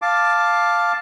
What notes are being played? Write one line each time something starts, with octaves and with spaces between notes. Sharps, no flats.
F5 A5 D6